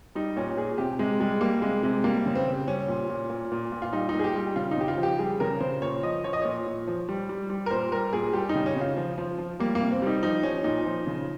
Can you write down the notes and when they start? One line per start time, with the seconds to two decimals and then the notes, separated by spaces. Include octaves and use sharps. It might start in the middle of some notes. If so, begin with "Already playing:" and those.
0.15 G3 D#4
0.36 A#2 C#4
0.57 A#2 G#4
0.78 C3 G4
0.99 C3 G#3
1.20 G3 G#3
1.41 G3 A#3
1.62 C3 G#3
1.83 C3 G#3
2.04 G3 A#3
2.26 C#3
2.35 C4
2.46 C#3
2.68 G3 C#4
2.88 A#2
3.10 A#2
3.30 A#2
3.52 A#2
3.72 A#2
3.82 F4
3.93 G3 D#4
4.09 D#4
4.15 A#2 G#4
4.24 G4
4.36 G3
4.56 C#3 F4
4.71 D#4
4.77 C#3 G4
4.88 F4
4.98 F3
5.03 G4
5.19 G3 G#4
5.40 C#3 A#4
5.61 C#3 C5
5.82 A#2 C#5
6.03 F3 D#5
6.24 F3 C#5
6.33 D#5
6.42 A#2 C#5
6.67 A#2
6.87 F3
7.09 G3
7.29 G3
7.50 G3
7.66 A#4
7.71 A#2 C5
7.92 G3 A#4
8.13 A#2 G#4
8.33 G3 G4
8.49 D#4
8.55 C#3
8.66 C#4
8.76 C#3 F4
8.97 F3
9.18 F3
9.38 F3
9.60 G3 A#3
9.75 A#3
9.80 C3
9.92 C4
10.02 G3 D#4
10.23 F3 D#4
10.43 F3 C#4
10.64 A#2 D#4
10.86 F3
11.07 C#3